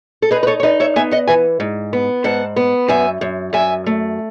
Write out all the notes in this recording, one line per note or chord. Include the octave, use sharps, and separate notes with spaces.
A4
D#4 G#4 B4
B4
A4 C#5
C#5
D#4 B4 D#5
C#5 E5
B3 E5 G#5
D#5 F#5
E3 E5 G#5
G#2
B3
G#2 F#5 A5
B3
F#2 E5 G#5
F#2
F#2 E5 G#5
A3